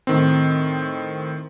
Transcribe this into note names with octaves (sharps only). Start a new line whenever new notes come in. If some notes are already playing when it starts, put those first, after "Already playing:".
A2 D#3 C4